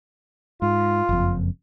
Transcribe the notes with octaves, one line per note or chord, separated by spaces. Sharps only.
G#2 F4
F#1 F2